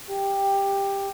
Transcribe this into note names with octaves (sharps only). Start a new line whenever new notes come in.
G4